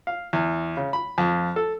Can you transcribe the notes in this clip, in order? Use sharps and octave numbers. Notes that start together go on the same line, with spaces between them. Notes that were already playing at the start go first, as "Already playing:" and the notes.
F5
E2
C#3
B5
F2
A4